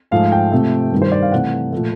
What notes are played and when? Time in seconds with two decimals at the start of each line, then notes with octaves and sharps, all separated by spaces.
0.11 G#2 F3 A3 F5
0.32 G5
0.52 C3 F3 A3
0.92 G2 D#3 G3
1.02 C5
1.12 D5
1.22 F5
1.32 C3 E3 A3 F#5
1.72 A#2 F3 A3